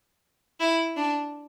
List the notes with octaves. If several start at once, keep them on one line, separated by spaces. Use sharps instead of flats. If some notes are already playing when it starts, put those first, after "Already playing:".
E4
D4